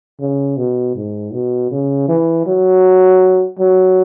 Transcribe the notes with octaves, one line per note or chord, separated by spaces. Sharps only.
C#3
B2
G#2
B2
C#3
E3
F#3
F#3